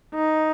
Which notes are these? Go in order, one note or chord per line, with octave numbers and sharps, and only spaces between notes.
D#4